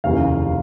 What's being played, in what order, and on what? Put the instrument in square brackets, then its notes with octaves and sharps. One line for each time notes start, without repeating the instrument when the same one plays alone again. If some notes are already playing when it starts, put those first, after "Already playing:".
[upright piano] F1 D#2 C#3 E3 F5